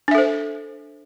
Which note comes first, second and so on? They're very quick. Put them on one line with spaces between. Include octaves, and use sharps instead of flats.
D4 E5 A4 C5